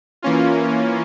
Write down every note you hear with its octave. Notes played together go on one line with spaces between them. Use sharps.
E3 A#3 C#4 F4